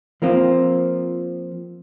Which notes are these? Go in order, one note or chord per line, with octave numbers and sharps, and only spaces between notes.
F3 A#3 C4 F4